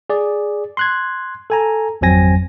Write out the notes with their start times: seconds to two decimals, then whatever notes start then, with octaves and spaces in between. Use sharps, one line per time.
0.10 G#4 D5
0.77 C6 F#6 G#6
1.50 A4 G#5 A#5
2.01 G#1 F2 F#3 C4 G#5 A#6